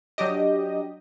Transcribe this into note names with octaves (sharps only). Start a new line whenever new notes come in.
F#3 D4 G4 D#5